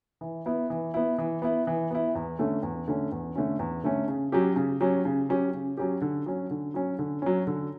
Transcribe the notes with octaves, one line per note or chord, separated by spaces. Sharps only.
E3
B3 E4
E3
B3 E4
E3
B3 E4
E3
B3 E4
E2
D3 A3 C#4
E2
D3 A3 C#4
E2
D3 A3 C#4
E2
D3 A3 C#4
C#3
F#3 C#4 G4
C#3
F#3 C#4 G4
C#3
F#3 C#4 G4
C#3
F#3 C#4 G4
D3
F#3 C#4
D3
F#3 C#4
D3
F#3 C#4
D3